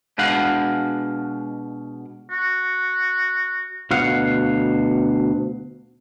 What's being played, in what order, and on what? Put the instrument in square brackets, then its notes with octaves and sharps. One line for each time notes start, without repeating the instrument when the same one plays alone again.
[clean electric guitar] B2 G#3 D4 F5 F#5
[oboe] F#4
[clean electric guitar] D2 B2 F5 F#5